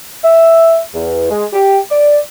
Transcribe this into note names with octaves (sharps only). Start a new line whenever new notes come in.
E5
E2
G#3
G4
D5